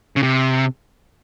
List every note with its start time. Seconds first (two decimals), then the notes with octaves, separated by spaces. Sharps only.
0.16 C#3
0.23 C3